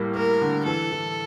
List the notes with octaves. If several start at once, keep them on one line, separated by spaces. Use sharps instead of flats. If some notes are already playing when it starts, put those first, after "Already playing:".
Already playing: A2 G3 A#3
A#3 A#4
D3
E3 A4
E3